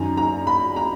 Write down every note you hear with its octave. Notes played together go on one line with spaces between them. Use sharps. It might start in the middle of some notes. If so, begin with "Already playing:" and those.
Already playing: F#2 D#3 A#5
A#5
B5
A#5